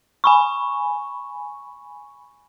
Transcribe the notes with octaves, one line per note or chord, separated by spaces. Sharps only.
G#5 B5 C#6